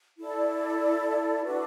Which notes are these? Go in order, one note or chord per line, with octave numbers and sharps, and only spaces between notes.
E4 A4 D5
D4 F#4 B4